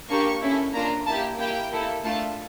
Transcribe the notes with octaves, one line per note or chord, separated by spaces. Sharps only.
A#3 D4 G4 C#6
C#4 E4 A4
A#3 D4 F4 A#5
A#3 E4 G4 A5
A#3 E4 G4 G5
A#3 E4 A4
A3 D4 F4 A5